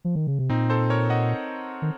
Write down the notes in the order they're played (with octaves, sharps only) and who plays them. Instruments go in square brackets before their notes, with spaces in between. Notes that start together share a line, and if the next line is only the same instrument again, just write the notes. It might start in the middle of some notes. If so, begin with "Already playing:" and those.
[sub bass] F3
D#3
C#3
C3
[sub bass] A#2 [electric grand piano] C4 D#4
[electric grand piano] A4 C5
A#4 C#5
D#5 F#5
[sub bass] D#3